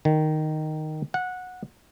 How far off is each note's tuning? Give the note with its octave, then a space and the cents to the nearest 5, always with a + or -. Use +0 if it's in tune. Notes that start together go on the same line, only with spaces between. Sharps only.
D#3 -5
F#5 -15